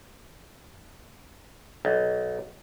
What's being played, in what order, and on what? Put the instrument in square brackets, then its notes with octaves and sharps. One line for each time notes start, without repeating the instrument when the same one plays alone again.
[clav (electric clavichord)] B1